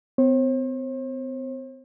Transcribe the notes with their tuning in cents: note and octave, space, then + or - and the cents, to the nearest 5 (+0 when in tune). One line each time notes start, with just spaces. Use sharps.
C4 -45 C5 +45